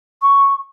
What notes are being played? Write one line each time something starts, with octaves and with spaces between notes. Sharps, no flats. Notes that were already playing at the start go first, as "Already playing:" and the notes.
C#6